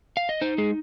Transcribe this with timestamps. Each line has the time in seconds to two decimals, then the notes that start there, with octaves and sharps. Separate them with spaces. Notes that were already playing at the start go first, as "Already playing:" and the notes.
0.17 F5
0.29 D#5
0.41 D#4 C5
0.58 G#3 G#4